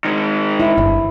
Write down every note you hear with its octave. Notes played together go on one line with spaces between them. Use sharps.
D#3 G#3
E4
G1